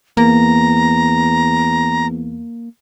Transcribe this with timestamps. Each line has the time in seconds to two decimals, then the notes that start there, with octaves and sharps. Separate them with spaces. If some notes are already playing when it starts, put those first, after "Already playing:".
0.17 E2 A#3 A#5